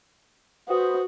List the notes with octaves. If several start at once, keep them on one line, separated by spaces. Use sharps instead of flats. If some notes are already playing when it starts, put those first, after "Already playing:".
F#4 B4 C5 D#6